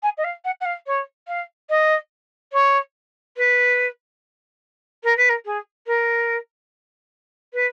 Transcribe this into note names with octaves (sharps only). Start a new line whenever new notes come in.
G#5
D#5
F5
F#5
F#5
F5
C#5
F5
D#5
C#5
B4
A#4
B4
A#4
G#4
A#4
B4